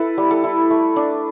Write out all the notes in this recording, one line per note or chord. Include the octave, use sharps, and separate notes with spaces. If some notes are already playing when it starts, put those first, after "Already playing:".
Already playing: E4 A4 B4
G3
A4
E4
A3
D4